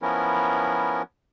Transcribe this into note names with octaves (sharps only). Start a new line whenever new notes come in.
F3 B3 C#4 E4 A#4